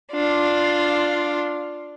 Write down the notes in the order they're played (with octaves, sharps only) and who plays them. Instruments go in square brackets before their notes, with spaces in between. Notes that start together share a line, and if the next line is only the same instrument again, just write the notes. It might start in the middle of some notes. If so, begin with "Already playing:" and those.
[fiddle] D4 F4